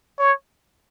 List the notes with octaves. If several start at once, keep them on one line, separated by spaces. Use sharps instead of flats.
C#5